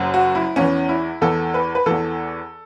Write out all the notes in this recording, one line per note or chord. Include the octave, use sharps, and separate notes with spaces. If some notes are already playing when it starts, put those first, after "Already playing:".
Already playing: F#1 F#2 F#3
F#4
E4
E2 E3 C#4
E4
E2 E3 A4
B4
B4
E2 E3 A4